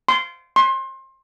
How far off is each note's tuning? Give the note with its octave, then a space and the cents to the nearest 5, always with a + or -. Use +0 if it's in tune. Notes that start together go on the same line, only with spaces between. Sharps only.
C6 -15
C6 +30